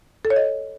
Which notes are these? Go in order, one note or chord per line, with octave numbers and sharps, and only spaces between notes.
A4
C#5
D#5